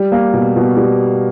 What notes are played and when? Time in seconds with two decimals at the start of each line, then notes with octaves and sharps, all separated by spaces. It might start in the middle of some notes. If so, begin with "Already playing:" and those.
Already playing: G3
0.12 A#3
0.33 B2
0.56 B2
0.77 G3